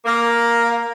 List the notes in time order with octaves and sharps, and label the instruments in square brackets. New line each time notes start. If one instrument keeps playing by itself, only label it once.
[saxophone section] A#3